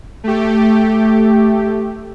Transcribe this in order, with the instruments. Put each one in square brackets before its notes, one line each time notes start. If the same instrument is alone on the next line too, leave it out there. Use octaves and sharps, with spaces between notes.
[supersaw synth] A3 G4